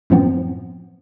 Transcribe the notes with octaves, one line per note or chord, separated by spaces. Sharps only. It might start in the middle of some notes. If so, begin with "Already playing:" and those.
F#2 A2 F3 B3 C4